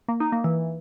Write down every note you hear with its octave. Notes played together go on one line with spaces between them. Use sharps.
A#3
D#4
A#3
E3